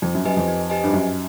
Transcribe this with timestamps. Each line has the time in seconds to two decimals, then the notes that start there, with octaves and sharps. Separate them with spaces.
0.02 F2 D#4
0.15 F#2
0.25 F#2 G4 B4 D#5 G#5
0.37 F2
0.48 D#4
0.70 G4 B4 D#5 G#5
0.84 G2
0.93 F#2 D#4